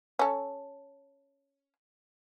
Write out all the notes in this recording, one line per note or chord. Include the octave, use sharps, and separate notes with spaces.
C#4 A4